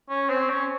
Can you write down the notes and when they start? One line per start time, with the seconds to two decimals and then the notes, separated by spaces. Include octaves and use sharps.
0.10 C#4
0.30 C4
0.50 C#4